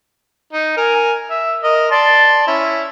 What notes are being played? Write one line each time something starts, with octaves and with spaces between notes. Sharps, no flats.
D#4
A#4 G#5
E5
A#4 D#5
D5 A5 C6
C#4 E4